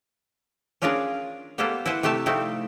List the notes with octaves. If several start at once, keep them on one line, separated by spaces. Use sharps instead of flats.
C#4 D4 F4 G#4 A#4 D5
G3 A#3 B3 G4 A4 C5
E4 B4 C5 F#5
C3 A3 G4 E5 A5
F3 G3 A3 C4 D#4 E4